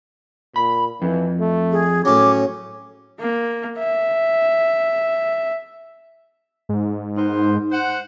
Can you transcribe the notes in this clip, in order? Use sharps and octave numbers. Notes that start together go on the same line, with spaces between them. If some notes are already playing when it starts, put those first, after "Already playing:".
A#2 B5
F2 E3
A3
G#4
A2 F#3 C#4 D6
A#3
E5
G#2
B3 D#4 A#4 C5
C5 F#5